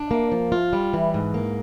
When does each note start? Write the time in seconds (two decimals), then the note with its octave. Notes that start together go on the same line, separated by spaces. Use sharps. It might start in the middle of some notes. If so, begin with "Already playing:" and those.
Already playing: D4
0.11 A#3
0.32 F3
0.52 F4
0.73 G3
0.93 E3
1.14 G#2
1.34 A#3